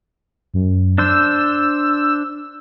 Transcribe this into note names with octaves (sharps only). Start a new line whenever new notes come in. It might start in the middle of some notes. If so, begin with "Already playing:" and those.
F#2
D4 C5 E6